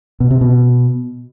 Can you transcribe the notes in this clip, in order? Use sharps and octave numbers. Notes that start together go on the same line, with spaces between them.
B2
C3
B2